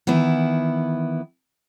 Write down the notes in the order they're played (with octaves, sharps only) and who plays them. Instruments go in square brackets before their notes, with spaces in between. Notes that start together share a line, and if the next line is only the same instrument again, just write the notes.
[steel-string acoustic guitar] D#3 E3 B3 E4